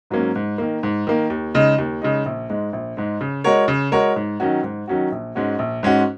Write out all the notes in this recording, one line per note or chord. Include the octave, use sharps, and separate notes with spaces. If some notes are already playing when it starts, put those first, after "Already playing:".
G#2 F#3 A#3 C#4
G#2
D#3 A#3
G#2
D#3 A#3
D#2
C#3 G#3 D#4
D#2
C#3 G#3 D#4
A#1
G#2 G#3
A#1
G#2 G#3
C#3
G#3 F#4 A#4 C#5
C#3
G#3 F#4 A#4 C#5
G#2
D#3 F#3 C#4 F#4
G#2
D#3 F#3 C#4 F#4
A#1
G#2 G#3 C#4 F#4
A#1
G#2 G#3 C#4 F#4